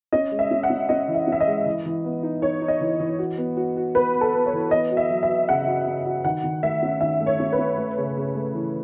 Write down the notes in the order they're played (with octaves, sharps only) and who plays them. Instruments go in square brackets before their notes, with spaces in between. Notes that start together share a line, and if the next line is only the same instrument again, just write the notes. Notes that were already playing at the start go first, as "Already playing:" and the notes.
[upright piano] C#4 [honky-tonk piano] D#5
[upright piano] G#3
[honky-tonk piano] E5
[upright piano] C#4
[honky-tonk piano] F#5
[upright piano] C#4
[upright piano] C#4 [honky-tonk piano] D#5
[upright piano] E3
[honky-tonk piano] E5
[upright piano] C#4 [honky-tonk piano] E5
[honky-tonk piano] D#5
[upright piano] G#3
E3
E3
B3
D#4
[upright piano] D#4 [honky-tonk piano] C#5
[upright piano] D#4
[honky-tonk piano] D#5
[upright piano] E3
E3
F#4
B3
F#4
F#4
[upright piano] B3 [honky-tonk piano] B4
[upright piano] B3
[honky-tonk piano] A4
[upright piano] B3
[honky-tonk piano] C#5
[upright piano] E3
[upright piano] B3 [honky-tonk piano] D#5
[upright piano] F#4
[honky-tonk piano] E5
[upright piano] F#3
[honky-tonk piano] E5
[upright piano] F#4
[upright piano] C#3 [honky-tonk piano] F#5
[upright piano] F#4
C#3
F#4
[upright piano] D#3 [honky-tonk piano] F#5
[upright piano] D#3
[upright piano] A3 [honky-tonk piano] E5
[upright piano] C#4
[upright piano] D#3 [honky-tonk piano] E5
[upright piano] A3
[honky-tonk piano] C#5
[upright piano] C#4
[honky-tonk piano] B4
[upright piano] C#4
A3
C#3
C#3
A3
E3